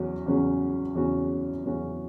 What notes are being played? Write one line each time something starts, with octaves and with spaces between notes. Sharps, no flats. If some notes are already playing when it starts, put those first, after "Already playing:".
Already playing: E2 C#3 F#3 C#4 F#4
E2 C#3 F#3 C#4 F#4
E2 C#3 F#3 C#4 F#4
E2 C#3 F#3 C#4 F#4